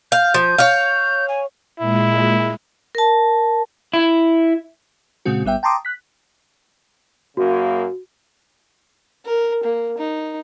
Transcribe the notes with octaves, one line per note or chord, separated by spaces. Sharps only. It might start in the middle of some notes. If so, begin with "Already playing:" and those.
F5 G6
F3
C#5 F5
G#5
A#2 G#3 E4
A#4 A5
E4
A#2 C#3 G#3 C4 F#4
G#1 G3 B3 E5 G5
G5 A5 A#5 C6 D6 D#6
F#6 B6
F#2 C#3 A#3 F#4
A#4
A#3
D#4